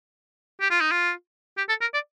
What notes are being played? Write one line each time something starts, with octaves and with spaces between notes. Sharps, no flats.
G4
F4
D#4
F4
G4
A4
A#4
D5